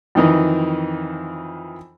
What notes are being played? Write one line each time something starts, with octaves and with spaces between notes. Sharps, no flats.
F2 D#3 E3 D#4